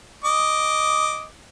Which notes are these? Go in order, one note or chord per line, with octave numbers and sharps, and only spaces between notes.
D#5 D6